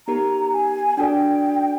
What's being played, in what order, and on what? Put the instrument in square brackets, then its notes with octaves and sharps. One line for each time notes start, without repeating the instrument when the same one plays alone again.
[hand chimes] B3 D#4 G4 A#4 [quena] A#5
[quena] G#5
[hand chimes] D4 F#4 A4 D5 [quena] G5